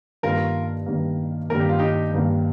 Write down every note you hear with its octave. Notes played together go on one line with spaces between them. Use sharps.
G2 D#3 A#3 F4 A#4
G2 D#3 A#3
G2 D#3 A#3 A#4
G4
F4
D#4 G4
G2 D#3 A#3